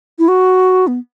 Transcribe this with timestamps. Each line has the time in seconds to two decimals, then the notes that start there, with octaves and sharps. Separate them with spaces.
0.19 E4
0.28 F#4
0.87 B3